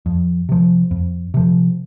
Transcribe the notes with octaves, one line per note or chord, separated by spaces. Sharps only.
F2
C3 F3
F2
C3 F3